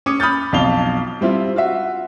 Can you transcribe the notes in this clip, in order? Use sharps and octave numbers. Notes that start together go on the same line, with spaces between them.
C#4 D6 D#6 C#7
B5 D#6 F6 G6 A6
B1 F2 F5 A5 F7 G7
G3 C4 E4 F4
F4 F#4 E5